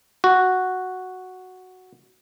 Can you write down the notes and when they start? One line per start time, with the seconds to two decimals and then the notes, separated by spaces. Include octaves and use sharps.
0.24 F#4